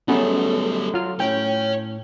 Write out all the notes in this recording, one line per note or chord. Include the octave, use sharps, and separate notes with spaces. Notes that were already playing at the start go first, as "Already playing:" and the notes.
F#3 G3 A3 B3 C#4 G#4 A4
F#3 F4 F6
A2 C#5 G5 G#5